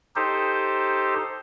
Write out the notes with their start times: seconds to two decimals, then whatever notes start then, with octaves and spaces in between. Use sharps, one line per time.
0.16 D#4 G4 A4 C5